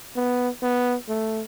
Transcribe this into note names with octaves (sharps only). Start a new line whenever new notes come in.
B3
B3
A3